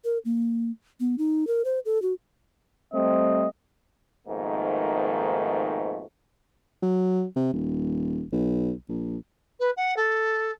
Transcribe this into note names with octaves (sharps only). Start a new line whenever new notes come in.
A#4
A#3
B3
D#4
A#4
C5
A4
F#4
G3 A3 C4 D#5
F2 G#2 B2 D#3 A3 A#3
F#3
C3
D#1
B1
A#1
B4
F#5
A4